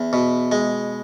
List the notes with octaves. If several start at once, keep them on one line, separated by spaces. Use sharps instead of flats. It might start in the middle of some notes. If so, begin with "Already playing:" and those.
Already playing: E2
B2
G#3